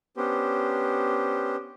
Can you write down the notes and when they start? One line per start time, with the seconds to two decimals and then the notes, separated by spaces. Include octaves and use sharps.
0.17 B3 C#4 D4 G4 C5